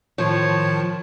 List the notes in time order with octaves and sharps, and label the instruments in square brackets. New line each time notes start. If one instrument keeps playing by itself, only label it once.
[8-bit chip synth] A2 D#3 A5 [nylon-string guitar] F3 [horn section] C5 C#5